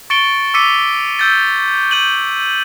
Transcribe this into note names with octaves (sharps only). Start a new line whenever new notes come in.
C#6 A6 C#7 D7 G7
D6 E6 B6 C#7 D#7
E6 G6 A6
G6 D#7 F#7